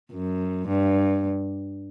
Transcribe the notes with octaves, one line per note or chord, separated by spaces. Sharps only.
F#2
G2